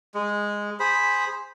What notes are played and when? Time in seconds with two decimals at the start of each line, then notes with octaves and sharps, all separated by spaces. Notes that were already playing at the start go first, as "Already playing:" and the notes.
0.15 G#3
0.80 G#4 C5 B5